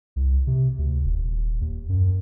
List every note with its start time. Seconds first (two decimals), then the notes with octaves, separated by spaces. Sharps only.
0.16 C2
0.47 C3
0.78 D2
1.04 D#1
1.61 D#2
1.89 F#2